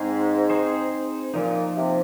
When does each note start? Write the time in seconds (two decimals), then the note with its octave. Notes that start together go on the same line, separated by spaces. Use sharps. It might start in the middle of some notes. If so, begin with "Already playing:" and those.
Already playing: G#2 C4 D#4 G#4 C5
0.50 C4 D#4 G#4 C5
1.34 A#2 F3 A#3 D#4
1.76 C3